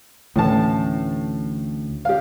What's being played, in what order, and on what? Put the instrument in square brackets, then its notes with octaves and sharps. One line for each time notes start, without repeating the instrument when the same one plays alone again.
[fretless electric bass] D2 E3 C#4 [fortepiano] A2 A5
[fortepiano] G4 F5